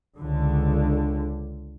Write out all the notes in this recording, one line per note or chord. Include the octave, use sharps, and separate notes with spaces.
C#2 D3